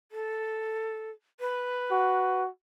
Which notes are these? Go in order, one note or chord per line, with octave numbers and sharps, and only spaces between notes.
A4
B4
F#4